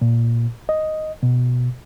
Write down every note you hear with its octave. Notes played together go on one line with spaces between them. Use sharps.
A#2
D#5
B2